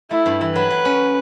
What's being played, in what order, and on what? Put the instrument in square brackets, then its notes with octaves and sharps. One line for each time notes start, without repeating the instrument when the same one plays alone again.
[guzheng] A3 [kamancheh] E4
[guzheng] G2
E3
[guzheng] F#3 [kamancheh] B4
[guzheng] F#3
C#4